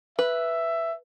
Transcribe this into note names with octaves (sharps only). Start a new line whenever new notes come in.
B4 E5